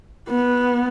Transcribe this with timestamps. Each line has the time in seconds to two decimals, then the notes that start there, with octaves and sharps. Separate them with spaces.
0.28 B3